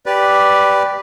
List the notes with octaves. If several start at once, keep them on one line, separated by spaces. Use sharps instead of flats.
G4 B4 D5